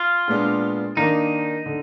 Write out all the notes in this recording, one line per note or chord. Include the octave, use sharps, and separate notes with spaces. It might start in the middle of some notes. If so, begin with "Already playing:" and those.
Already playing: F4
A#2 G#3 B3 D4
D#3 A#3 D4 D#4
D3